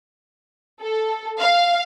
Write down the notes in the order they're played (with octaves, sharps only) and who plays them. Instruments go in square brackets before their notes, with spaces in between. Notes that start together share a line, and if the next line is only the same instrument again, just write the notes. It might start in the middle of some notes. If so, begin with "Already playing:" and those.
[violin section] A4
F5